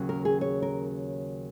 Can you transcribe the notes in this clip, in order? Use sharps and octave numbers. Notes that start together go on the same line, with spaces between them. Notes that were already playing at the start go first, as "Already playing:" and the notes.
Already playing: D#2 C#3 F#3
A#4
G#4
C#5
A#4